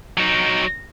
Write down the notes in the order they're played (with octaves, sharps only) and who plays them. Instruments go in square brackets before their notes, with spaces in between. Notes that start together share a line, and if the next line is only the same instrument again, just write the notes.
[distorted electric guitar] F#3 D#4